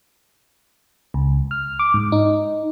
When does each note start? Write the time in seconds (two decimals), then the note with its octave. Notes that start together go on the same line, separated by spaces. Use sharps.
1.14 C#2
1.51 F6
1.79 D6
1.94 G#2
2.12 D#4